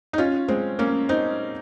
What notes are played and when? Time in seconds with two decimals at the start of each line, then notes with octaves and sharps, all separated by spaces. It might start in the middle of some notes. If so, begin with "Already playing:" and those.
0.13 D#4
0.18 C#4 F4
0.48 G#3 C4
0.79 A#3 C#4
1.09 C4 D#4